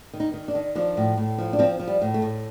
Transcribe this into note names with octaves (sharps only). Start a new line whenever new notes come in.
D#3
D#4
D#3
D4
D#3
F3 D4
A2
A2
F3
D4
F3 C4
F3
G3
A2
A3
A2